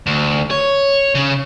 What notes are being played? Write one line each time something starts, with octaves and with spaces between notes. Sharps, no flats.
D2
C#5
C#3